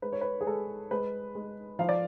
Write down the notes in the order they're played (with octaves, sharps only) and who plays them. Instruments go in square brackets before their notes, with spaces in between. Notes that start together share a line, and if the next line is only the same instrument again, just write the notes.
[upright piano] G#3 B4
C#5
B4
G#4
G#3 A4
G#3 B4
G#3
F3 F5
D5